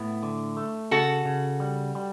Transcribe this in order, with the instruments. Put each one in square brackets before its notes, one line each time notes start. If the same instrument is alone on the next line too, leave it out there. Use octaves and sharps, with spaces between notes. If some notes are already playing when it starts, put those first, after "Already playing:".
Already playing: [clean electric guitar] A2 B3 [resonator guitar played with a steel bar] E4
[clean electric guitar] D3
A3
[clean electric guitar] C#3 [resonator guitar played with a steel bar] F#4 A4
[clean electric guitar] C#3
G3
G3